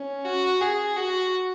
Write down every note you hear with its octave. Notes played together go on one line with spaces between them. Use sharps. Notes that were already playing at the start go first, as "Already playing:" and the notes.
Already playing: C#4
F#4
G#4
F#4